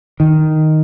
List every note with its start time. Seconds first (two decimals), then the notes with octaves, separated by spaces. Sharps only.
0.20 D#3